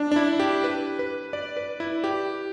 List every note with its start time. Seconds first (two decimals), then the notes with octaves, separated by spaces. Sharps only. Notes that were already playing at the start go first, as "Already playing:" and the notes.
Already playing: D4
0.12 D4
0.16 E4
0.40 G4
0.64 B4
0.99 B4
1.33 D5
1.57 B4
1.80 E4
2.04 G4